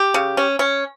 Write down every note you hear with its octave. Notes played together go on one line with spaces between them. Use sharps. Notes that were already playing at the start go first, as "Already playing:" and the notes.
Already playing: G4
C#3
C#4
C#4